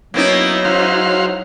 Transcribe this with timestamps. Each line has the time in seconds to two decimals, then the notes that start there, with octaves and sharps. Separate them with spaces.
0.14 F#3 A#3 B3 C#4 D#4 E4
0.65 G#2 F#4 F5 C6